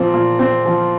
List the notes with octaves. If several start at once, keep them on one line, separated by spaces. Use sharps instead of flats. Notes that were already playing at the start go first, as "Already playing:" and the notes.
Already playing: A#2 F3 C4
A#2
C4
F3